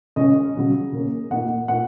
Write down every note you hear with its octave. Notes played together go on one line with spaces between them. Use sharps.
C#3 G#3 C#4 D#5
C#3 F#3 C#4
C#3 A#3 C#4
A#2 A#3 D#4 F#5
A#2 A#3 D#4 F#5